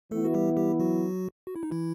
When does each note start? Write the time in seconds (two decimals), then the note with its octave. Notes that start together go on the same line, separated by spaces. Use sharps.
0.11 E3 A3 B3 E4 A4
0.25 F#4
0.34 G3 G4
0.57 G3 G4
0.79 F#3 F#4
1.47 F#4
1.56 E4
1.63 D#4
1.71 E3 E4